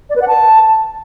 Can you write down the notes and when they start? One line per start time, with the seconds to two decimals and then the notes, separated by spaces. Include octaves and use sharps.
0.10 D5
0.16 B4
0.22 F#5
0.28 A5